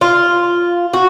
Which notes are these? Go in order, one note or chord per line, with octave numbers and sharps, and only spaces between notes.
F4
F#4